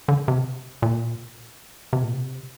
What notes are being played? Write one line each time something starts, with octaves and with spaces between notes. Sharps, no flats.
D3
C3
A#2
C3
A#2
C3